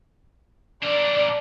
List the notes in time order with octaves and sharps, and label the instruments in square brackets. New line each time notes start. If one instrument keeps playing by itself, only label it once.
[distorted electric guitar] D4 A#4 [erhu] D5